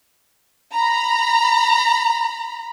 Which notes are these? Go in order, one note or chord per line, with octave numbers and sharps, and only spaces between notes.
A#5 B5